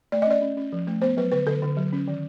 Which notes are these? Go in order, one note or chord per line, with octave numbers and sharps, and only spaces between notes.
A3 D5
D#5
C#4 D5
C#4
C#4
F3
A3
B3 C5
F#3 B4
D3 B4
D3 A4
D3
F#3
C#4
D#3